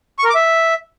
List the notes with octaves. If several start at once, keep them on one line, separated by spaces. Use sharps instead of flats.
C#6
A#4
D6
E5